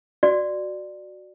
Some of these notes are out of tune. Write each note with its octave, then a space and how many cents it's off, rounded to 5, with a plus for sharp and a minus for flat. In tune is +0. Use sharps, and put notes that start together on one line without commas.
F#4 +0 D5 +15